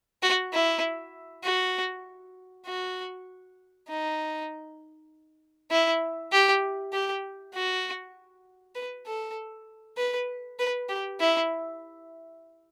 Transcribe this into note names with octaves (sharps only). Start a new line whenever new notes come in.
F#4
E4
F#4
F#4
D#4
E4
G4
G4
F#4
B4
A4
B4
B4
G4
E4